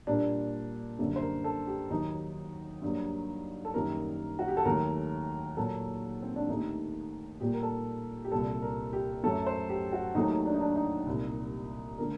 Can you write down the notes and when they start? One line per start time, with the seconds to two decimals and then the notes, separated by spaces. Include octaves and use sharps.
0.07 A#2 G3 A#3 D4
0.99 F#2 D3 G3 A#3
1.16 C5
1.22 A#4
1.44 A4
1.67 G4
1.90 D#2 D#3 F#3 A#3 D#4
2.82 G2 F#3 A#3
3.65 A4
3.74 F#2 D#3 G3 A#3 A#4
4.39 F#4
4.48 G4
4.57 A4
4.65 D#2 D#3 F#3 A3 A#4
5.57 A#2 F#3 A#3 A4
6.22 C4
6.36 D4
6.48 D#2 D#3 A3 D#4
7.41 A#2 G3 A#3 G4
7.54 A#4
7.63 A4
8.24 G4
8.32 C2 A#2 G3 A4
8.62 A#4
8.93 G4
9.24 F#2 F#3 A3 A4
9.46 C5
9.69 G4
9.92 F#4
10.15 D#2 D#3 F#3 A3 D#4
10.46 D4
10.54 D#4
10.61 D4
10.76 D#4
11.06 C2 A#2 G3
11.98 D3 A3 A#4